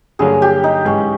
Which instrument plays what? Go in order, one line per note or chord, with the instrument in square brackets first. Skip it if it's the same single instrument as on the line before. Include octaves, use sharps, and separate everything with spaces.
[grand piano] G2 D3 F#3 A#3 [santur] G#4
[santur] G4
D#4
[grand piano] G#2 E3 G#3 [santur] C#4